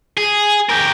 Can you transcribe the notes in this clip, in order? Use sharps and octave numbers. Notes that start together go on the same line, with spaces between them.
G#4
G4 A#4